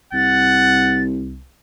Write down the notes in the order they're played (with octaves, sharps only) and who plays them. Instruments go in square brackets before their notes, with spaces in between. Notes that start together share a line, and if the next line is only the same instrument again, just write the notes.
[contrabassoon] C2 [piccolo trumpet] F#5 [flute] A6